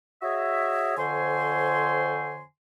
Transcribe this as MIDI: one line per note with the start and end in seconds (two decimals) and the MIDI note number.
0.22 0.94 66
0.22 0.94 68
0.22 0.94 73
0.22 0.94 75
0.22 0.94 76
0.97 2.42 41
0.97 2.42 50
0.97 2.42 72
0.97 2.42 73
0.97 2.42 80
0.97 2.42 84